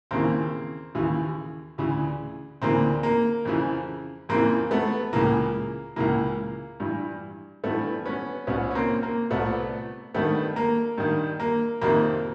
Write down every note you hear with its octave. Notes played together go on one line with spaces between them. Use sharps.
D#2 C#3 E3 A#3 C4
D#2 C#3 E3
D2 C#3 E3
D2 C#3 E3 A#3 C4
A#3
F2 C#3 E3
F2 C#3 E3 A#3 C4
A3 B3
C#2 C#3 E3 A#3
C#2 C#3 E3 A#3
G2 E3
G2 E3 A3 B3
B3 C#4
C2 A#2 B3 C#4
C#4
A#3 C4
A#3
C2 A#2 A3 B3
G2 D#3 A3 B3
A#3
G2 D#3
A#3
F2 C3 D#3 A#3